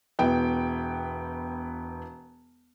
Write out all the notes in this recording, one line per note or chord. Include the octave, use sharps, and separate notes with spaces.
E1 B3 E4 G5